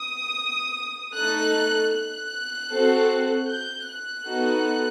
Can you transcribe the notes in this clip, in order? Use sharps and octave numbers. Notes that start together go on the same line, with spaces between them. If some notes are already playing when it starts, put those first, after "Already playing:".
Already playing: D#6
A3 D#4 A4 F#6
F#6
C4 F#4 A4
G6
F#6
B3 D#4 F#4 A4